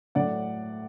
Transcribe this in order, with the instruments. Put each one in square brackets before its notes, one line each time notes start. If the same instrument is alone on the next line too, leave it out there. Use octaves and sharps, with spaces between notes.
[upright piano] A2 F#3 D5 F#5